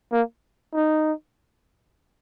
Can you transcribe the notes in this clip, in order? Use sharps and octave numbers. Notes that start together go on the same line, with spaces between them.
A#3
D#4